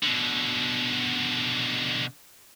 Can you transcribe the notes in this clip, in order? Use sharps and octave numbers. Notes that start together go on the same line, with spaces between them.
B2 D3